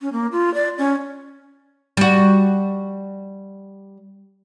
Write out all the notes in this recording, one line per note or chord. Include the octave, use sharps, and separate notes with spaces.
C#4
A#3
F4
D5
C#4
G3 F#4